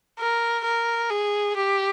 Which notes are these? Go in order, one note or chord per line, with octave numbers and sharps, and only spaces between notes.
A#4
A#4
G#4
G4